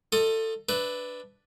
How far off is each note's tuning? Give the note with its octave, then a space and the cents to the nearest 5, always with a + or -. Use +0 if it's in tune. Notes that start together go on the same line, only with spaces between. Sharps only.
F4 +30 A4 +20 D#5 +0
D4 +0 B4 +5 E5 -10